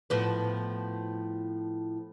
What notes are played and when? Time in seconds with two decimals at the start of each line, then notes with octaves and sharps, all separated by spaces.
0.10 A2 F3 B3